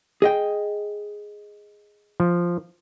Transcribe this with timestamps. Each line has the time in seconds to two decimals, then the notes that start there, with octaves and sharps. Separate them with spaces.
0.22 G#4 D#5 G5
2.20 F3